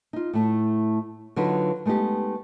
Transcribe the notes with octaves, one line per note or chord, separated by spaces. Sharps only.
D#4 F4
A2 A3
D3 F#3 D#4 F4 F#4 B4
G#3 A3 B3 D#4 G4